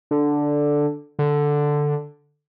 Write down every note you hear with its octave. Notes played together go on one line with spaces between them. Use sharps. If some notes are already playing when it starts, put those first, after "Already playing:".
D3
D3